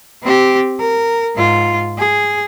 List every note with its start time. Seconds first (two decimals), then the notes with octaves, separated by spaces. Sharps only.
0.23 C4 G4
0.79 A#4
1.36 G#2 F4
1.98 G#4